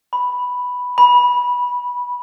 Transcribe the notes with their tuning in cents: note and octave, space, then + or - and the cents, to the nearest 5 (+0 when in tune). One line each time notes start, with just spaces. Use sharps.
B5 +0
B5 -15